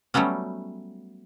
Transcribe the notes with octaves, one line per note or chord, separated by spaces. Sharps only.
F#3 G3 A3 B3 C#4